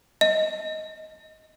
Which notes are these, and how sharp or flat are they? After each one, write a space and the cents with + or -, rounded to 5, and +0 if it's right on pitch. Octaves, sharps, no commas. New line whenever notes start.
D#5 +15